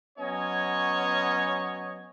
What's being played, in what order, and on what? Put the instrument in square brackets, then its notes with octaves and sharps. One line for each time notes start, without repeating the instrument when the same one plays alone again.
[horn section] F#3 B3 C#4 C#5 D#5 G#5